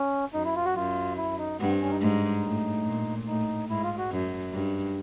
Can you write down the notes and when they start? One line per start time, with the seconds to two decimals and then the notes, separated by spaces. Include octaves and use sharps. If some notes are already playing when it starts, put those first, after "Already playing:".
Already playing: C#4
0.34 F#2 D#4
0.45 E4
0.55 F4
0.65 F#4
0.76 F#2 F4
1.17 E4
1.38 D#4
1.60 G2 B3
1.70 C4
1.81 C#4
1.91 D#4
2.01 G#2 D#4
2.43 A2
2.85 A#2
3.27 A2 D#4
3.69 G#2 E4
3.83 F4
3.98 F#4
4.11 F#2
4.53 G2